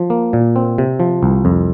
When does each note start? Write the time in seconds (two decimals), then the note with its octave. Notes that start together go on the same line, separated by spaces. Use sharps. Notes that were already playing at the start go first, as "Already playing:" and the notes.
Already playing: F3
0.10 A#3
0.33 A#2
0.56 C4
0.78 C3
1.00 F3
1.23 C2
1.45 F2